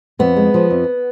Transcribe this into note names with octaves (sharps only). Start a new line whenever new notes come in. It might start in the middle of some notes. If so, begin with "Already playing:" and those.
F2 B3
G#3
F3
F2